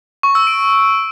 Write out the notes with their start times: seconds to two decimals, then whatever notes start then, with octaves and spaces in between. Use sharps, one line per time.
0.23 C#6
0.35 E6
0.47 D7